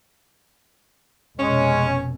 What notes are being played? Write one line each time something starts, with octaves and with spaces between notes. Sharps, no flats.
F1 B2 G#3 C#4